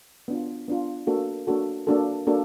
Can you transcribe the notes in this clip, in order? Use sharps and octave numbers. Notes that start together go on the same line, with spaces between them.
B3 D4 F4
B3 D4 F4
A#3 D4 F#4 A4
A#3 D4 F#4 A4
A#3 D4 F#4 A4
A#3 D4 F#4 A4